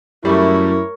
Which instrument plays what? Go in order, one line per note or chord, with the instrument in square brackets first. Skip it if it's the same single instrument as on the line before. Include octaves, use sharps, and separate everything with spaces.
[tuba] F#2 [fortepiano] G3 A3 [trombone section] E4 [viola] A#4 C#5